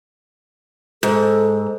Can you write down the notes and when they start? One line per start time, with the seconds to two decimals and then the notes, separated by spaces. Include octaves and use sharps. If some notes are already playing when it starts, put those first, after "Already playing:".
1.03 G#2 A4